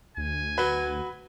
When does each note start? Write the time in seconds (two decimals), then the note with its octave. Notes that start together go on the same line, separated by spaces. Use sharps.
0.17 D2 G#5
0.58 F#3 B4